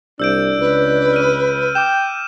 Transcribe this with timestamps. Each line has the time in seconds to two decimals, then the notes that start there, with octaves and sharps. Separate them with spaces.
0.20 C2 D4 E6 G6 D7
0.59 C#2 B4
1.13 F6 D#7
1.75 G5 D6 E7